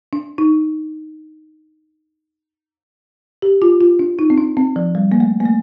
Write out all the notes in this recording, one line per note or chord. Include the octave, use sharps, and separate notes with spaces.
D4
D#4
G4
F4
F4
D4
D#4
C4
D4
C4
F3
G3
A#3
A3
A#3
A3